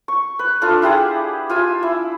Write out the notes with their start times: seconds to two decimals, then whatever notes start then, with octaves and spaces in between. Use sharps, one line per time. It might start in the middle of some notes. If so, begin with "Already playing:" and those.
0.08 C#6
0.39 B4
0.62 D4 F4 A4
0.82 E4 G4 G#4 F#5
1.50 F4 G#5 E6
1.83 E4